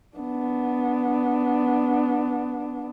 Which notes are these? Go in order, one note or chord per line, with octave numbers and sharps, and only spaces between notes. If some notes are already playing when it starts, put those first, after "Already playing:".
B3 D4